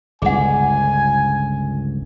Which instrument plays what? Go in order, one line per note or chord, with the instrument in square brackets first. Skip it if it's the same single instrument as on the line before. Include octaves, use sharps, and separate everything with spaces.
[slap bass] G1 C#2 [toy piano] G#4 F#5 [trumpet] G#5